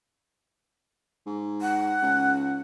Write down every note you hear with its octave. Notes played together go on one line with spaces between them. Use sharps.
G#2
F#5
C#2